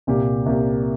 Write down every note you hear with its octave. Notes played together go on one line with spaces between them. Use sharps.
C2 A#2 A#3 G4
C2 A#2 A#3 G4